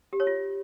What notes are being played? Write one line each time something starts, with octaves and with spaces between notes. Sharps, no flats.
G4
C#5
F4